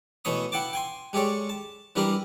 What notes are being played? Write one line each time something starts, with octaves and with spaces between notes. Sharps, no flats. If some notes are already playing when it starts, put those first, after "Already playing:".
B2 E3 A3 C#5 B5 D#6
E4 F#5 G5 A5 D6
G5 G#5 C6
G#3 G4 A4 C#5 D5
A5
E3 G3 D4 E4 G4 A#4